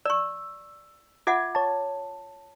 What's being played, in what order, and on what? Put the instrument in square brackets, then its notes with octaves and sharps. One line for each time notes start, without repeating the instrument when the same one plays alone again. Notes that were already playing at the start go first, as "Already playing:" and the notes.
[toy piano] D5 C#6 [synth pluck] E6
[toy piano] F4 E5 F#5 [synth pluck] D6 G#6
[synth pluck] C#5 A5